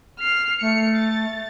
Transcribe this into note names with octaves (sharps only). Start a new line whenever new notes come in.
F6 C7
A3 C#7
A6